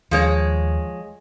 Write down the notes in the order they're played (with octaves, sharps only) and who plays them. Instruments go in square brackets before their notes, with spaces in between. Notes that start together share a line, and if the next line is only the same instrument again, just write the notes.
[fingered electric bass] D#2 [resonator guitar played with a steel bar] F3 G#3 C#5